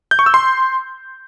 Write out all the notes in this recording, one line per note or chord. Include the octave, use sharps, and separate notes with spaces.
G6
C#6
E6
C6